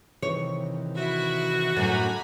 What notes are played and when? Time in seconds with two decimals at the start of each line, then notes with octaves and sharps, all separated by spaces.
0.23 C3 D#3 E3 C#5
0.97 E4 F#4 E5
1.76 F#2 A2 D3 G#5 A#5 B5